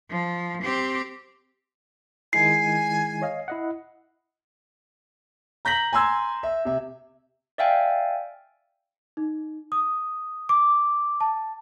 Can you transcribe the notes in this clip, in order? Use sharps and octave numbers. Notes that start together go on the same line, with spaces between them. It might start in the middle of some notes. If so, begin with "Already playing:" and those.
F3
C4 G4
D#3 G#3 E4 G#5 C7
C#5 D#5 F5
E4 D#5 F#5
A#5 G6 A#6 B6 F#7
G#5 A#5 C6 E6 G#6
E5
C3 E5
D5 E5 F5 G5 G#5
D#4
D#6
D6
A5